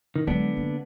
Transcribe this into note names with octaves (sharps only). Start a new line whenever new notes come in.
D#3
D3 F#3 G#3 B3 D4
A#3